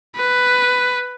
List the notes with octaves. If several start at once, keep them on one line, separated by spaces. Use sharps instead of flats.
B4